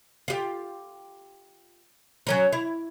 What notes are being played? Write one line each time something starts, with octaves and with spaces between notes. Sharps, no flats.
F4 G4
F#3 C#4 A#4
E4